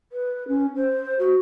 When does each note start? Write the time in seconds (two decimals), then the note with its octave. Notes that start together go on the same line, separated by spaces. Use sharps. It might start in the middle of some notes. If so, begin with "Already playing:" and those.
0.12 B4
0.48 C#4
0.76 C5
1.19 F#4